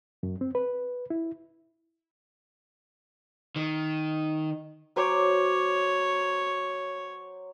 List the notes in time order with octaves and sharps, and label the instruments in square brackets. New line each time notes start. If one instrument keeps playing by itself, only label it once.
[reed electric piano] F#2
C4
B4
E4
[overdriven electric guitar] D#3
[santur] F#3 C5 D6 [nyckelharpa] C#5